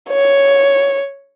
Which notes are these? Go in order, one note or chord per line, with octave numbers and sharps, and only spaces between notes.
C#5